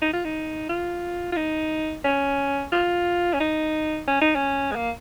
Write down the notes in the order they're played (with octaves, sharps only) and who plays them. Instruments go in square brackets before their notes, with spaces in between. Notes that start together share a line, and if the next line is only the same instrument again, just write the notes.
[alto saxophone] D#4
F4
D#4
F4
F4
D#4
C#4
F4
C#4
D#4
C#4
D#4
C#4
G#3
A#3